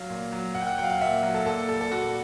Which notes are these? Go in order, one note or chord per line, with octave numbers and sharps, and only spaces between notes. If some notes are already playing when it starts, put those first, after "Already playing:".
Already playing: F#3 F5
A#2
F#3
A#2 F#5
G5
F#5
F#3 G5
F5
F#5
A#2 E5
F#3
A4
A#2 A4
G3 A4
A4
A#2 F#4